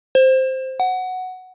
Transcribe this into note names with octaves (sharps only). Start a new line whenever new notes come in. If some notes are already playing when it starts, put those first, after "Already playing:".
C5
F#5